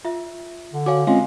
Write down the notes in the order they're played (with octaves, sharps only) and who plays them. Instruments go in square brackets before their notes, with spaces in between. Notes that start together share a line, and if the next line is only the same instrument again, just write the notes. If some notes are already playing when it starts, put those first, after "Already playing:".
[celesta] F4 E5
[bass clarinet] D3
[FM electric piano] F#4 C#5 [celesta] F5 G#5 D6
[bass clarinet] G#3 [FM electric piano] C4 C#4 F4 [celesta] F5 G#5 C6